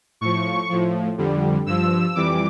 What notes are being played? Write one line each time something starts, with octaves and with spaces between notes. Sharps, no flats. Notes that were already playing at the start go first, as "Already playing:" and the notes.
A2 F3 C#6
A2 F3
F2 D3 G3
G2 F3 E6
F2 E3 G3 D6